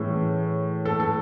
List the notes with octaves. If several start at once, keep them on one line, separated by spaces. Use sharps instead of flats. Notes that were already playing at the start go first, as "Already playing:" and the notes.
Already playing: A2 E3 G#3 C#4
A4
A4